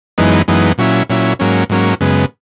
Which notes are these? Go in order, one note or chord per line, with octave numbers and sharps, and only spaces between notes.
F#2 E3 G#3 B3 D#4
F#2 E3 G#3 B3 D#4
A#2 F#3 C#4 E4
A#2 F#3 C#4 E4
G#2 F#3 A#3 C#4
G#2 F#3 A#3 C#4
F#2 C#3 G#3 B3